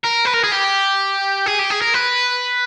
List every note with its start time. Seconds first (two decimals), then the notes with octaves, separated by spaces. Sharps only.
0.04 A#4
0.26 B4
0.34 A#4
0.44 G#4
0.52 G4
1.46 G#4
1.59 G4
1.70 G#4
1.81 A#4
1.94 B4